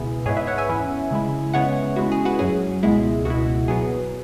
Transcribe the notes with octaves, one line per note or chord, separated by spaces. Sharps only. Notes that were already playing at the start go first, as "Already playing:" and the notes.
Already playing: C#2 B2 B3 E4 G#4
G#2 G#3 B3 E4 G#4 C#5
B4 E5
C#5 F#5
E5 G#5
E2 E3 C#4 E4
C#3 G#3 E4
C#3 G#3 B3 E4 C#5 F#5
C#3 G#3 E4 F#4
G#4
F#4 B4
F#2 F#3 C#4 G#4
C#2 B2 G#3 E4
C#2 B2 G#3 E4 F#4
B2 F#3 B3 G#4